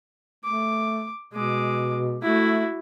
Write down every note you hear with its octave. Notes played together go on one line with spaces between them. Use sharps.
A3 D6
B2 G#3 D6
A3 E4 F#4